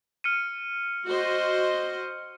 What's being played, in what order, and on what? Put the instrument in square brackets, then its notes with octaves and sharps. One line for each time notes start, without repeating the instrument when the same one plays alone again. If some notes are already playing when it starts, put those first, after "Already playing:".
[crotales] F6 C#7 D#7
[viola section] F#4 C5 D#5